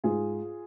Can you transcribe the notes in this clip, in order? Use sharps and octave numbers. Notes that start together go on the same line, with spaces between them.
G#2 F4 G#4